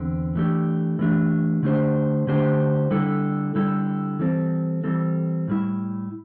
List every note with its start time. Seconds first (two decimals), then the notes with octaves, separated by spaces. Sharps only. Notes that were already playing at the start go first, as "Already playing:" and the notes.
Already playing: E2 D3 C4
0.35 E3 A3 D4 G4
0.99 E3 A3 D4 G4
1.63 D3 A3 D4 G4 C5
2.27 D3 A3 D4 G4 C5
2.91 D3 G3 E4 A4
3.55 D3 G3 E4 A4
4.19 E3 G3 C4 A4
4.84 E3 G3 C4 A4
5.48 A2 G3 E4